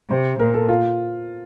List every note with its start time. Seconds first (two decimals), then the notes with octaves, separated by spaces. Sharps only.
0.10 C3 C5
0.39 A#2 A#4
0.54 A4
0.69 F4